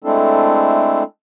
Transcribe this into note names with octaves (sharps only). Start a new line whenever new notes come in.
G#3 A3 C4 D4 E4 A4